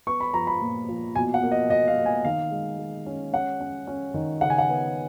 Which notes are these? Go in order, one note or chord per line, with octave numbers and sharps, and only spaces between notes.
B3 C#6
B5
F3 A#5
B5
A#2
F3
B2 G#5
F#5
A#3
D#5
B2 D#5
F5
A#3
G#5
D#3 F5
G#3
G#3
C#4
C#4 F#5
C#4
C#4
D#3
C#3 F#5
G#5
F#5
B3